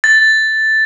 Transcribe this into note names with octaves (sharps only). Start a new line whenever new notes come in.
A6